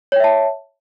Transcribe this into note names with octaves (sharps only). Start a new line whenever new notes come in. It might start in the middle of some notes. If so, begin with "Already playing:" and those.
C#5 E5 G5 A5